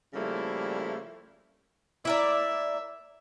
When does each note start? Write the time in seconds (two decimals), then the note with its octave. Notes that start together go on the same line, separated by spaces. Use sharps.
0.13 C#3 F3 G3 A3 A#3 E4
2.05 E4 A#4 D5 E5